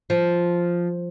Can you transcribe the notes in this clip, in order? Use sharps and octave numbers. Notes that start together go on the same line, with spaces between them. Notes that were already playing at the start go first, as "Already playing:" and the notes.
F3